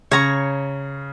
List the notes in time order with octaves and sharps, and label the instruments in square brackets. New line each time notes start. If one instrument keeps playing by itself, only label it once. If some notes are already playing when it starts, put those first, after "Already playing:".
[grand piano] C#3 [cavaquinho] C#5 A#5 C#6